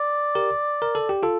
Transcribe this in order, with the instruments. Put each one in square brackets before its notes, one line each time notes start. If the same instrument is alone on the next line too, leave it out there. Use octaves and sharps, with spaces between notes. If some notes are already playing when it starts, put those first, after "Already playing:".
Already playing: [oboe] D5
[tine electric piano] G4 A#4
A#4
A4
G4
F4 A4